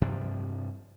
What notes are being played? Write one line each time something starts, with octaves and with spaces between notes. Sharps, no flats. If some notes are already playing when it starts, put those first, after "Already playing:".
G2 C3 F3 G3